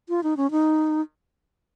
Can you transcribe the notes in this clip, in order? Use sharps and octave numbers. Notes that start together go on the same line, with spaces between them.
F4
D#4
C#4
D#4